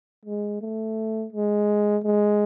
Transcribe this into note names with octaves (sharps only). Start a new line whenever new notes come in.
G#3
A3
G#3
G#3